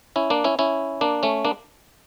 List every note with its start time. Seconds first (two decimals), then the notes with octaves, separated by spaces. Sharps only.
0.16 C#4 E4
0.30 A#3 D4
0.44 C#4 E4
0.59 C#4 E4
1.01 A#3 D4
1.23 A3 C#4
1.45 A#3 D4